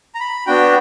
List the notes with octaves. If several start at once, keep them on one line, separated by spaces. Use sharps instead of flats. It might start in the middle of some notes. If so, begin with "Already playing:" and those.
A#5
B5
B3 D4 F#4 G5